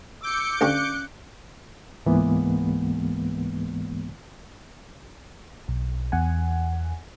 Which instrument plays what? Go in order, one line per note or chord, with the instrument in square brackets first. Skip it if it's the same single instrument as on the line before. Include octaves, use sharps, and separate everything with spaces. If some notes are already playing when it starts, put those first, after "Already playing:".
[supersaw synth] D6 G6 C#7 [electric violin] E6
[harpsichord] D2 G4 C#6 [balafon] C#4 D5 F5 [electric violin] F#6
[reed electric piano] C#2 G#2 E3 G#3 A#3 B3
[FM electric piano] B1
E2 F#5 G#5